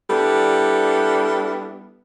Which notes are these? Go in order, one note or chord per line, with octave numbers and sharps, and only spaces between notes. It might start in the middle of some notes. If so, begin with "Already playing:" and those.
G3 B3 D4 E4 A4